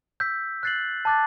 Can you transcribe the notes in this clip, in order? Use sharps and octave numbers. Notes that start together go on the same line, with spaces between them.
E6 G6 B6
F#6 A6 C7 F#7
A5 D6 F#6 A6